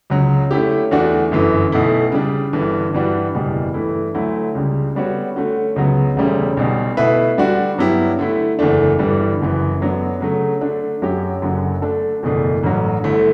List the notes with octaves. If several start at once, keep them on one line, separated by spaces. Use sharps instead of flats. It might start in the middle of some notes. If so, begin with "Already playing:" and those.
C#2 C#3 F#3
D3 A3 C#4 E4 G4
E2 D3 A3 D4 F#4
G1 F#2 E3
B1 B2 A3 E4
C#3 G3 D4
G1 G2 E3
G2 E3 G3 D4 F#4
F#1 E2 B2 G3
G2 E3 A3 E4
D2 D3 F#3 A3 E4
C#2 C#3 G3
D3 G3 B3 F#4 C#5
D3 A3 C#4 F#4
C#2 C#3 F#3 B3
E1 D2 C#3 G3 C#4
B1 B2 G3
B2 A3 E4 B4 E5
D3 G3 D4 F#4
G2 F#3 B3 E4 G4
D3 A3 E4
F#1 E2 D3 A3 D4
G1 G2 E3 G3
F#1 F#2 E3
F#2 D3 F#3 B3 D4
C#3 F#3 A3
D3 A3 D4
F#2 D3 F#3 C#4 G4
F#1 F#2 D3 F#3
D3 A3 D4 A4
F#1 E2 B2 A3 D4
A1 G2 D3 F#3
G1 G2 D3 A3 E4